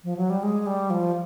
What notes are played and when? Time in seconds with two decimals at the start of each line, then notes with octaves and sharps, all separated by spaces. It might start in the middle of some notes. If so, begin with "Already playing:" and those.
0.04 F3
0.17 F#3
0.30 G3
0.43 G#3
0.66 G3
0.90 F3